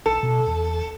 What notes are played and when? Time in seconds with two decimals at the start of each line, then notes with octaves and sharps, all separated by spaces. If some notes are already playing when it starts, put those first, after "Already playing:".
0.06 B1 A4
0.23 B2
0.47 E2